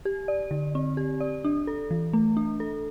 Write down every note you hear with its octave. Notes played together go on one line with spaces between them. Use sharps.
G4
D5
D3
C4
G4
D5
D4
A4
E3
A3
D4
A4